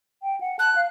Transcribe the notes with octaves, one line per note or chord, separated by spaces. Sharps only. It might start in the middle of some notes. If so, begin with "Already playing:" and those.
G5
F#5
A5 F#6
F5